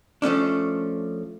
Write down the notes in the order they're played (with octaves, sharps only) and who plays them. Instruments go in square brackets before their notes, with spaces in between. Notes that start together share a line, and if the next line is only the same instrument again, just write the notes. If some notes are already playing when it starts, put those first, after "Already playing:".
[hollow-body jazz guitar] F3 A3 C#4 D4